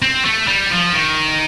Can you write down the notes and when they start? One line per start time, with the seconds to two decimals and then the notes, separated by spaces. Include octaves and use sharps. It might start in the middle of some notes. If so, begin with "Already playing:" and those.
0.02 C4
0.25 A3
0.48 G3
0.71 F3
0.94 D#3